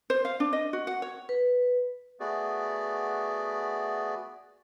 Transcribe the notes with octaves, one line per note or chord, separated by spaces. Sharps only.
C5
F5
D4
D#5
F#4
F#5
C#5
B4
A3 B3 F#4 G#4 D5